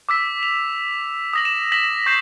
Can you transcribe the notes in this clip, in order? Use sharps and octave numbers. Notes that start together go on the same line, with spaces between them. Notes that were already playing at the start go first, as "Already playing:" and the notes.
D6 E6 B6
F7
D#6 A#6 F#7
E7
A#6 B6 F#7
C#6 G6 A#6 C7 E7